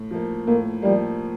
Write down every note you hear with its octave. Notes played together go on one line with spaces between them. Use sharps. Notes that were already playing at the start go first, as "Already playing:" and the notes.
Already playing: A2
F3 A#3
A2 A#3
F3 G3 A#3